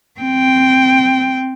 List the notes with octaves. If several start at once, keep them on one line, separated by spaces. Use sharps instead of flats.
C4 G5